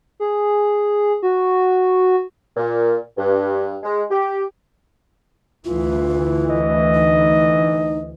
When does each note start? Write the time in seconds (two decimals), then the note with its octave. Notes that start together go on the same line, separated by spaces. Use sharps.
0.20 G#4
1.23 F#4
2.57 A#2
3.18 G2
3.83 G#3
4.11 G4
5.65 D2 E3 F4
6.50 D#5
6.94 D#4